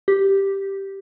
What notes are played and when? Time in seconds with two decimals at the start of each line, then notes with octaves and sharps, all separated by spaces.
0.08 G4